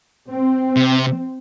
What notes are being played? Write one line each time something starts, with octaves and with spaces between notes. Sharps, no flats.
C4
C3